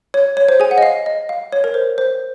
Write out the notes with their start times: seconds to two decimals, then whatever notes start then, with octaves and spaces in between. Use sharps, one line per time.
0.14 C#5
0.37 C#5
0.49 C5
0.60 G#4 G#5
0.71 F#5
0.78 D#5
0.83 F5
1.06 D#5
1.29 F5
1.52 C#5
1.64 A#4
1.74 C5
1.98 C5